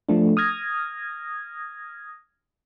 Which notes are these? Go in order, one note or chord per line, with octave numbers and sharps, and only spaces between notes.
F3 A3 D4
D#6 F6 G#6 A#6